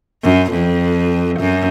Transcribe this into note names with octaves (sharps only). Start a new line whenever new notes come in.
F#2
F2
F#2